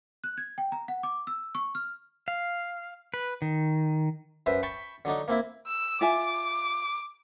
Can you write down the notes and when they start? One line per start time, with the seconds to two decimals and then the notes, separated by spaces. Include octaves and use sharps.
0.24 F#6
0.37 G#6
0.58 G5
0.72 A#5
0.88 F#5
1.03 D6
1.27 E6
1.55 C#6
1.75 F6
2.28 F5
3.14 B4
3.42 D#3
4.46 F#2 B4 C5 E5
4.63 G5 A5 B5 C#6
5.05 D3 F#3 D4 D#4
5.28 A#3 C4 E4
5.67 E6
6.01 F4 E5 G#5 D6